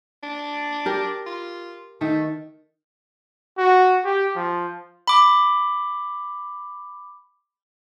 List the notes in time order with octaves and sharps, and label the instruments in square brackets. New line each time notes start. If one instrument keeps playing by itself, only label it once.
[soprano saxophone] D4
[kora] G4 A#4
[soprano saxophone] F4
[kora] D#3 [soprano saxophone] A3
[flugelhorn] F#4
G4
F3
[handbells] B5 D6